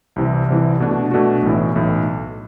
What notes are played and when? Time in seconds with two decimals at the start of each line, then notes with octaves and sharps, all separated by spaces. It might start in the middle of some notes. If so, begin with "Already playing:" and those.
0.16 C2 C3 E3
0.48 C2 C3 E3
0.80 B2 A3 D4 F#4
1.11 B2 A3 D4 F#4
1.43 B1 A2 E3
1.76 B1 A2 E3